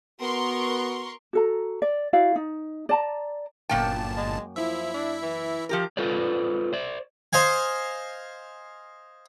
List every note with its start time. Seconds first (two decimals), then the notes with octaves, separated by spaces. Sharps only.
0.20 B3 F#4 A#4 C6 C#6
1.33 F#4 A4 A#5
1.82 D5
2.13 E4 F#4 D5 F5
2.36 D#4
2.89 D5 A5 A#5
3.69 G1 F#2 A#2 A#3 G5 A5
4.17 G#3
4.56 F3 E4 E5
4.94 D4
5.22 E3
5.69 F3 G4 A#4
5.97 F4 A4 B4 C5 D5
6.73 C5 D5
7.33 C5 D#5 F5 G#5